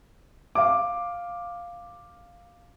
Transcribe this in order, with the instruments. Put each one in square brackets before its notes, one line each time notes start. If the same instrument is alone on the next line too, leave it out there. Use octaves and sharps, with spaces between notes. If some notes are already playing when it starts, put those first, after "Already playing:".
[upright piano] F5 D6